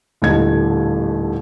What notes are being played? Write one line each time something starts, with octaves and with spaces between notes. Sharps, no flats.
D#1 D#2 A2 D3 D#5 G#6